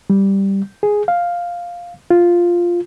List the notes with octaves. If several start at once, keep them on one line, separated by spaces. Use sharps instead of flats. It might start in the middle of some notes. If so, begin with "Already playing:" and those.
G3
G#4
F5
F4